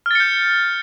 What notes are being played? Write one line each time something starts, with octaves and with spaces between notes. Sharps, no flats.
F6 G6 A6 C#7